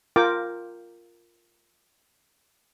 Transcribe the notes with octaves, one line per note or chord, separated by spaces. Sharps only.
F4 A#4 G5 D6